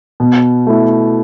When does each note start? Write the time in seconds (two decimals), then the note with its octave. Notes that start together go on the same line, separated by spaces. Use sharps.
0.20 B2
0.67 A3 E4